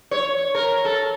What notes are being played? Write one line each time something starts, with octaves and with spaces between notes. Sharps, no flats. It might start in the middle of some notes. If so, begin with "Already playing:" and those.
C#5
A#4
A4